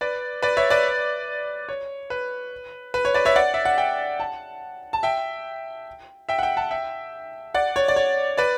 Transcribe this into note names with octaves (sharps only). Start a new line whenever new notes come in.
B4 D5
B4 D5
C#5 E5
B4 D5
C#5
B4
B4
C#5
B4 D5
C#5 E5
D5 F#5
E5
F#5
E5 G5
F#5 A5
A5
E5 G5
E5 G5
F#5
E5 G5
F#5 A5
E5 G5
D5 F#5
C#5
D5
C#5
B4 D5